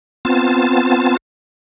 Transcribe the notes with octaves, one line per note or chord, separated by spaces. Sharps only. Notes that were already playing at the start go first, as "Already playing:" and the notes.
B3 C4 F4 A5